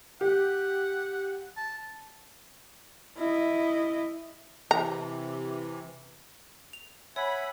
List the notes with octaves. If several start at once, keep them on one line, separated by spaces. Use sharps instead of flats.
G4 F#5
A5
E4 D#5
C3 E3 A#5
F7
C#5 E5 F#5 G#5 B5